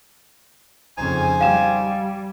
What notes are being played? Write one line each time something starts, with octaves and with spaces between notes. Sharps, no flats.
F2 C#3 D#4 C5 G#5
G3 F5 G5 E7